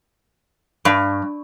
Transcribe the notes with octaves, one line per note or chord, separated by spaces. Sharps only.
G2